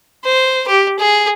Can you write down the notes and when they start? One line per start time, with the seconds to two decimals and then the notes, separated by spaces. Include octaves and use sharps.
0.25 C5
0.68 G4
0.99 G#4